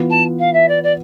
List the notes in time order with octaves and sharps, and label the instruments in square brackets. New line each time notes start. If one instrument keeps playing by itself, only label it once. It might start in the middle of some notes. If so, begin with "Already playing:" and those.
Already playing: [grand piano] E3 B3 F4 B4
[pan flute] A5
F5
E5
D5
D5